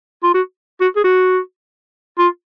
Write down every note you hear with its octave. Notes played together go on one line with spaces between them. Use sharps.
F4
F#4
F#4
G#4
F#4
F4